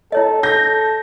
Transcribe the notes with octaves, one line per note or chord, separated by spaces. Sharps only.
E4 A4 C#5 D#5
A4 G6 A#6